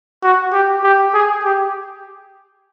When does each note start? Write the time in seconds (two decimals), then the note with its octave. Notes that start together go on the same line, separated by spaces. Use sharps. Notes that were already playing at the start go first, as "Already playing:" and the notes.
0.23 F#4
0.53 G4
0.83 G4
1.14 G#4
1.44 G4